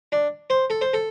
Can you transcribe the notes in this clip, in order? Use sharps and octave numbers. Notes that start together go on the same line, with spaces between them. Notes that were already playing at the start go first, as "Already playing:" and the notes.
D4
C5
A4
C5
A4